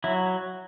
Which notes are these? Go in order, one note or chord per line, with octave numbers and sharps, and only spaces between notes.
F#3 E4